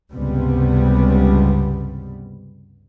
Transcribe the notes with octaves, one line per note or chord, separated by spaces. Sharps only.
C#2 G2 C3 G3 B3